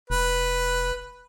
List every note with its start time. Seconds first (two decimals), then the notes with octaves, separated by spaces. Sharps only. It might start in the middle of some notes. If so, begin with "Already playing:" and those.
0.10 F1 B4